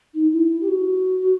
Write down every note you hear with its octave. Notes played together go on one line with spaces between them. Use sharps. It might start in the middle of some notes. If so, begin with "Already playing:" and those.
D#4
E4
G4
F#4